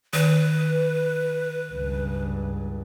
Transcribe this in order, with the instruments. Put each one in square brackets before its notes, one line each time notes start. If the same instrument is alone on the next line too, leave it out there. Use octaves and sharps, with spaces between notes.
[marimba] D#3 [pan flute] B4
[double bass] C#2 G2